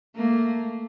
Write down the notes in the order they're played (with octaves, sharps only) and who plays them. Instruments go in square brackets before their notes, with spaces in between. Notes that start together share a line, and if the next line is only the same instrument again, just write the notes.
[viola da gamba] A3 A#3